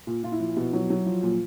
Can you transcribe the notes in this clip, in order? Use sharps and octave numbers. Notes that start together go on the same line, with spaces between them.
A#2
A#2 F4
E4
F3
B2
F#3
F#3
F3
A#2